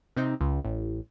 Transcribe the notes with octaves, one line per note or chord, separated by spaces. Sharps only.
C3 C4 D#4
C#2
A1